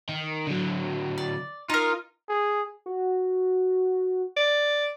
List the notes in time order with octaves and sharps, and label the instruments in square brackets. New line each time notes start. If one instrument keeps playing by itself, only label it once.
[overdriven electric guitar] D#3
D3 F#3
[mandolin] D5
[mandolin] D#4 A#4 [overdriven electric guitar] F4
[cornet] G#4
[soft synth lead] F#4
[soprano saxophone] D5